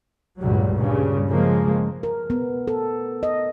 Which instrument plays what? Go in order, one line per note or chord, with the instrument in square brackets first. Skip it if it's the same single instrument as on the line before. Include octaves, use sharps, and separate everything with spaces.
[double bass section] C#2 G2 A#2 F#3 G3
G2 A#2 C#3
C#3 F3 G#3 A#3
[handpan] A#4
B3
A4
D#5